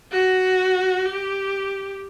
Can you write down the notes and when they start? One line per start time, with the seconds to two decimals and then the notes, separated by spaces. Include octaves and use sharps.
0.12 F#4
1.06 G4